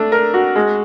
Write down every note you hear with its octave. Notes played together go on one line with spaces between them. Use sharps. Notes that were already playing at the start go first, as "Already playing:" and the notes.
Already playing: A3 D4
A#4
F#4
G#3